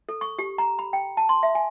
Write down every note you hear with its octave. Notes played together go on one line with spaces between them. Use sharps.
A4
C#6
G4
A#5
B5
G5
A5
C6
E5
G#5